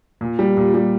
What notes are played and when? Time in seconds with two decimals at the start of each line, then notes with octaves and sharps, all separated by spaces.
0.21 A#2
0.39 G3
0.57 A#2
0.74 G3